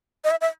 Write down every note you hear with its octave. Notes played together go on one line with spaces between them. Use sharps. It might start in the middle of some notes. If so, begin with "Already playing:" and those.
D#5
E5
E5